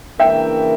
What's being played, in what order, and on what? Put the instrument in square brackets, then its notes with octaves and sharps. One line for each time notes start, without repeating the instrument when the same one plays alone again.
[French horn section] C#3 E3 A#3 D4 A#4 [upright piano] E5 G5